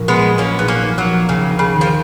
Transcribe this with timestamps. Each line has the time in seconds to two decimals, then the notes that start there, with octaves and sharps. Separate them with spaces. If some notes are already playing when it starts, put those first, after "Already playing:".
Already playing: A#1 A#2
0.08 G#3 B3
0.16 F#3
0.38 A#2 A#3 C#4
0.59 B3 D#4
0.68 A#3 C#4
0.83 F3
0.98 F#3 A#3
1.06 B3
1.29 D#2 C#3
1.51 D#4
1.59 C#3
1.74 D#3
1.81 F3